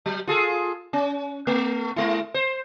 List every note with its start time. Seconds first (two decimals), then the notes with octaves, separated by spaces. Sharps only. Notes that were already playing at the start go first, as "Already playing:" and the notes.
0.06 F#3
0.27 F4 G#4 A4
0.93 C#4
1.47 A3
1.96 G#3 E4
2.34 C5